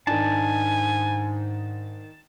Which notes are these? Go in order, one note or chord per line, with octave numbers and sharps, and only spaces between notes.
G#2 D#3 D4 G#5 A5